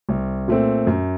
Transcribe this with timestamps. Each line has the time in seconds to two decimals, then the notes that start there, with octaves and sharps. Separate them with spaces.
0.09 C2
0.48 A#2 A3 C4
0.87 F#2